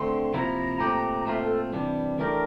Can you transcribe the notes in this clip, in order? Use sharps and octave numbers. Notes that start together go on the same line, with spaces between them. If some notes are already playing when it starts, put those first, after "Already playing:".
Already playing: D3 A3 C4 C6
C3 F3 A#3 E4 A#5
A#2 A3 C4 G4
A#2 A3 C4 F4 E5
A4
C3 E3 G3 D4
E3 A3 D4 G4 A#4